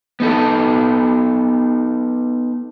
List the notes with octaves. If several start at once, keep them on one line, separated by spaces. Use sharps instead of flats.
B3 D#4 A4